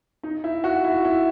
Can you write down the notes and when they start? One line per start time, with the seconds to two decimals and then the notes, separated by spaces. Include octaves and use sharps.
0.23 D#4
0.44 E4
0.64 F#4
0.84 E4
1.05 E4